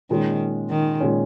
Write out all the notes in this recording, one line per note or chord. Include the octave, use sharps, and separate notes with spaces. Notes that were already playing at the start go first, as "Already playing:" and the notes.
A#2 D#3 G#3 C#4
D#3
A#2 G#3 C#4